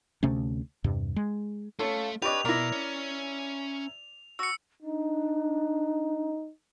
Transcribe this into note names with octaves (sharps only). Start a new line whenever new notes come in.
D2 C3 A3 C#4
E2 G2 C3
G#3
A3 C#4 F4 A4
D4 G4 B4 C#5 D#5 D6 F7
B2 E4 A#4 D5 A#5
C#4
F#4 E6 C#7
D4 D#4